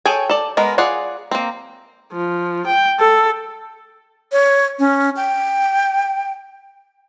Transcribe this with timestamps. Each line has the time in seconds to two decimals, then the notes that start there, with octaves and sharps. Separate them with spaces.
0.06 G#4 A4 C#5 G5 G#5
0.30 A4 D5
0.57 G#3 B3 A#4
0.78 F4 G#4 D5 F#5
1.31 A#3 C4
2.13 F3
2.66 G5
2.99 A4
4.32 C#5
4.79 C#4
5.16 G5